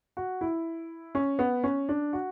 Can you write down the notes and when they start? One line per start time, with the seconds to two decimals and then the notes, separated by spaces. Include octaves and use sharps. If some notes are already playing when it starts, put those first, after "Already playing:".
0.17 F#4
0.41 E4
1.15 C#4
1.39 B3
1.64 C#4
1.89 D4
2.13 F#4